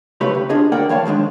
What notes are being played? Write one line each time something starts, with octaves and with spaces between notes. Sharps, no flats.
C#3 A3 G4 B4 C#5 B5
C#3
D4 F4 G#4 D#5
D2 A#3 A#4 D5 F#5 G5
E3 C#5 F5 A5
D#3 F3 G#3 D4